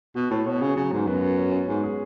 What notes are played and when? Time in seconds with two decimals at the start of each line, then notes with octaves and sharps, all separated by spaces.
0.15 B2 F#4
0.30 A2 C#5
0.46 B2 C#5
0.61 C#3 F#4
0.76 C#3 F#3
0.92 G#2 B3
1.07 F#2 B3
1.22 F#4
1.38 C#4
1.52 C#4
1.68 G#2 G#3
1.84 G#4